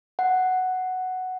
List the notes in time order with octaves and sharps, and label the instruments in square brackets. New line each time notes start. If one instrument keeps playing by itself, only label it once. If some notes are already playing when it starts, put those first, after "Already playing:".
[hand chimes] F#5